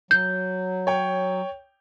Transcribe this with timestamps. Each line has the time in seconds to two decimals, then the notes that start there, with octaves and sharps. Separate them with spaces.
0.11 F#3 G6
0.87 C#5 G5